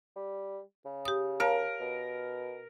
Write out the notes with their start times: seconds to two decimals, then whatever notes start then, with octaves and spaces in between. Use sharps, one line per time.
0.16 G3
0.85 C#3
1.05 G4 D#6
1.40 A#4 C#5 F5 A5
1.80 B2